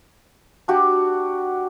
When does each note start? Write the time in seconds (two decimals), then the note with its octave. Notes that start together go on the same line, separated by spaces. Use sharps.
0.68 D4 F#4 G4